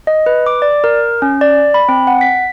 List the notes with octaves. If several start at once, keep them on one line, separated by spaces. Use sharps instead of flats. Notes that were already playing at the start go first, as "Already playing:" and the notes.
D#5
B4
D6
D5
A#4
C#4
D5
B5
C4
F#5
B6